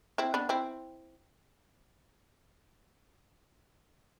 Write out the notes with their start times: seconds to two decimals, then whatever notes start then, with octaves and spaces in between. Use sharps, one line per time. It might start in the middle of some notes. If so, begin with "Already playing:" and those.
0.18 C4 E4
0.34 B3 D4
0.49 C4 E4